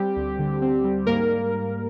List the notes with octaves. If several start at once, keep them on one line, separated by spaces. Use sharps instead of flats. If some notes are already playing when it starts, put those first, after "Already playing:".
Already playing: G3 C4 G4
D2
D3
C4
G3
G#2 A#3 A#4